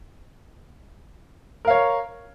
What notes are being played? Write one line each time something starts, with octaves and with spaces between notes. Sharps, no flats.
A#4 C#5 F5